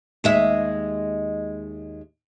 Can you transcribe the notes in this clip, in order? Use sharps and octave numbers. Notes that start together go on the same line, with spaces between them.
D#2 G#3 E5